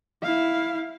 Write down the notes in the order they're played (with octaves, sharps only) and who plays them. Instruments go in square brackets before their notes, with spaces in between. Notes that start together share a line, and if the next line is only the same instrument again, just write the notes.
[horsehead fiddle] E4 F5